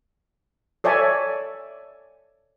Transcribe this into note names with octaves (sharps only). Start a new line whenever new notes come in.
A4 C#5 D5 E5 G#5